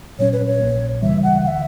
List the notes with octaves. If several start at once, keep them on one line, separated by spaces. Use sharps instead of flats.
A#2 F#3 C#4 C#5
B4
C#5
A#1 A#2 A#3
D2 C#3 E3 G3 E5
F#5
D3 E5 F#5